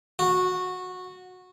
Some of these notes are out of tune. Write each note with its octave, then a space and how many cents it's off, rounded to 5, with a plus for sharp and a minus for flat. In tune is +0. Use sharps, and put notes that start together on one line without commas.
F#4 -15